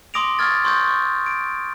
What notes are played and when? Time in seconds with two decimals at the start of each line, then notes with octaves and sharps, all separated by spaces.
0.14 C6 D6 D#6 A#6 D7 F7
0.39 C#6 F6 G#6 A6
0.65 C6 C#6 D#6 G6 A6
0.87 C#6
1.26 D7